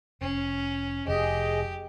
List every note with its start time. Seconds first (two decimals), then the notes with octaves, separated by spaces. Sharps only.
0.21 F1 C#4
1.08 F1 G4 G#4 D#5